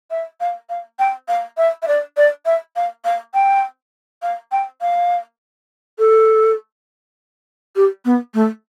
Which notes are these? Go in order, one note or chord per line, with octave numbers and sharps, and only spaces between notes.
E5
F5
F5
G5
F5
E5
E5
D5
D5
E5
F5
F5
G5
F5
G5
F5
A4
G4
B3
A3